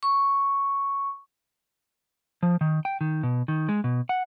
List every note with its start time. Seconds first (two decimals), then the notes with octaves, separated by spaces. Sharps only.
0.03 C#6
2.43 F3
2.61 D#3
2.85 G5
3.01 D#3
3.23 B2
3.48 D#3
3.69 G#3
3.84 B2
4.09 F#5